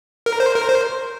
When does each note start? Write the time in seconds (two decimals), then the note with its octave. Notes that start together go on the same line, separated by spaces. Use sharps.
0.26 A#4
0.40 C5
0.55 A#4
0.69 C5